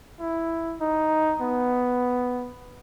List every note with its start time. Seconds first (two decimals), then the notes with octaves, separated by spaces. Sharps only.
0.20 E4
0.81 D#4
1.41 B3